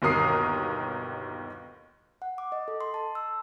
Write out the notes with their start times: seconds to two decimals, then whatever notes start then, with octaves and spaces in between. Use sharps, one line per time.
0.02 G1 D#2 B2 A#4 D#6 C7
2.22 F#5
2.38 D6
2.52 D#5
2.68 A4
2.81 C6
2.94 A5
3.15 E6